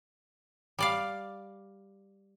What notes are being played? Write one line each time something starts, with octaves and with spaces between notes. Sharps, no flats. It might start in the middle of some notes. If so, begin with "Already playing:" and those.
G3 D5 F5